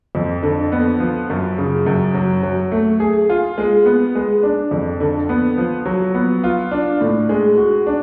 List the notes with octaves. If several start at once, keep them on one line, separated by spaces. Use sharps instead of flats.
F2
D3
B3
F3
F#2
C#3
F#2
F#3
F#3
A3
G#4
F4
G#3
B3
G#3
D4
F2
D3
B3
F3
F#3
B3
F4
D4
A2
G#3
F#4
D4